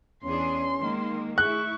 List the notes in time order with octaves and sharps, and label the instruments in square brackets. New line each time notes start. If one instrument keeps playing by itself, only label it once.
[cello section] E2 D4 G#4 [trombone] C#4 [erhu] C6
[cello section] D#3 G#3 A#3
[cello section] A3 E4 [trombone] G#4 [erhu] C#6 [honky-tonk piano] F#6